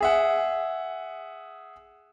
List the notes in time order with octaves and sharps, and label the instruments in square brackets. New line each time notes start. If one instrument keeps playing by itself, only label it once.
[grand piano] G#4 E5 F#5